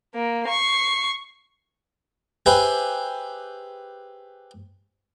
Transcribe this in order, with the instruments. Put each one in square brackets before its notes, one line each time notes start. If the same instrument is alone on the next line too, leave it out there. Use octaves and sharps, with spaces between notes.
[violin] A#3
C#6 C7
[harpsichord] G4 G#4 B4 C5 E5